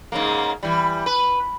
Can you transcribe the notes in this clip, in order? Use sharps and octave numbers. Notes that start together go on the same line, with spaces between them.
G#2 C#3 A#3
E3 G3
B4